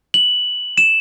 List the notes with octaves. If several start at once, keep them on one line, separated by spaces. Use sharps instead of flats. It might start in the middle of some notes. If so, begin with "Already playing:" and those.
F#7
E7